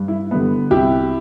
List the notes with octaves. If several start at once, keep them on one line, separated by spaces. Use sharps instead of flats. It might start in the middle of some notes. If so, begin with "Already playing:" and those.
Already playing: G2
E4
D3 G3 B3
C2 E4 G4